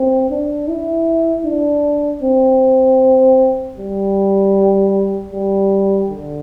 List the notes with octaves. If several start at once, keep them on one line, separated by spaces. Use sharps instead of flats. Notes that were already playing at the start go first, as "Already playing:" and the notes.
Already playing: C4
D4
E4
D4
C4
G3
G3
D3